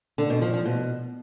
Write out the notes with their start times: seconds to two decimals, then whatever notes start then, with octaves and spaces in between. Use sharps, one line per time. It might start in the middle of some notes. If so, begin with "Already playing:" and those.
0.18 D3
0.30 B2
0.42 F3
0.54 F3
0.66 B2